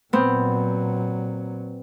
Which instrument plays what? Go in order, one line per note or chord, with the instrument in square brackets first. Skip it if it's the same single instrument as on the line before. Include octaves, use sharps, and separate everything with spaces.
[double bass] A#2 F#3 [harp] B3 C4